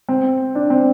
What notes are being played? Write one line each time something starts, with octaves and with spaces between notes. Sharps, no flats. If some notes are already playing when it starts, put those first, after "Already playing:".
C4
D4
C4